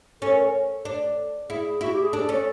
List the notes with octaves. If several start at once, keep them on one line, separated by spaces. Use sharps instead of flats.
C#4 A4
A#4
A4
D4
E4 G#4
E4 F#4
G4
G#4
D4 A4
C#4